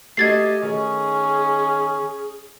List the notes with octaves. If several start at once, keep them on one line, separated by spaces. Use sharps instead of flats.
A3 F#4 G4 D#5 G#6 A6 C7
D#3 C#4 G#4